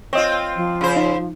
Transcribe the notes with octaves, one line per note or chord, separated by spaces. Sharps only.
C4 F4 C#5 D#5
F3
C#3 C5
D#4